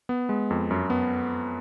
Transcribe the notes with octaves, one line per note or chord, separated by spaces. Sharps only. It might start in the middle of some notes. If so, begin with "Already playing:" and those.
B3
G#3
F2
F#2
B3